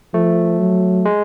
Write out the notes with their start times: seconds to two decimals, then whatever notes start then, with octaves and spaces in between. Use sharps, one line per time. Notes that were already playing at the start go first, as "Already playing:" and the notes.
0.14 F3 A3
0.59 F#3
1.05 G#3